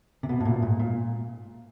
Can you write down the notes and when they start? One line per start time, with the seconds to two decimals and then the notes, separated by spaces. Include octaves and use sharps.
0.23 C3
0.29 B2
0.40 A2
0.45 A#2
0.62 G#2
0.79 A#2